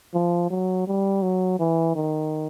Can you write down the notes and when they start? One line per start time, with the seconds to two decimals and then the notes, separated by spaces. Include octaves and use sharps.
0.14 F3
0.50 F#3
0.87 G3
1.22 F#3
1.59 E3
1.95 D#3